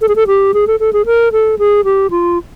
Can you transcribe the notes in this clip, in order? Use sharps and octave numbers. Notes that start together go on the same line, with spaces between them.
A4
G#4
A4
G4
G#4
A4
A4
G#4
A#4
A4
G#4
G4
F4